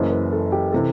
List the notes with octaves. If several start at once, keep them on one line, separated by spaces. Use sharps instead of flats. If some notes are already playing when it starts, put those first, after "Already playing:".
Already playing: F#1 F#2 E3 C5
B4
A4
G4
C3 E3 A4